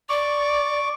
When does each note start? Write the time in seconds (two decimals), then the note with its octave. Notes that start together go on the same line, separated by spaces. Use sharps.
0.09 D5 C#6 D6